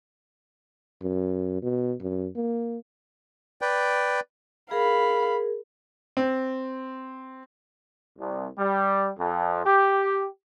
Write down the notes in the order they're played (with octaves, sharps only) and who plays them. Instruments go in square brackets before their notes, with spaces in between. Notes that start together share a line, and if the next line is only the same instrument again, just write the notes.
[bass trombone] F#2
B2
F#2
A#3
[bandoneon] B4 D5 G5
[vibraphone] G#4 A#4 [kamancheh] F5 B5
[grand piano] C4
[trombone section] C2
G3
F2
G4